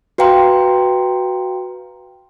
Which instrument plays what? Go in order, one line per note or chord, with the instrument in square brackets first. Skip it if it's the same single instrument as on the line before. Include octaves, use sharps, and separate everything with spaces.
[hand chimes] F#4 B4 F5 G5 A#5 C6